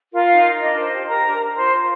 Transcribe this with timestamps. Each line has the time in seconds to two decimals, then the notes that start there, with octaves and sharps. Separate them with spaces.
0.14 F4 A#4 F5
0.30 D#4
0.46 A#4
0.62 D4 D#5
0.78 C5
0.94 G4
1.09 G4 A#4 A#5
1.25 D4
1.41 A#4
1.57 F4 C5 C6
1.73 F4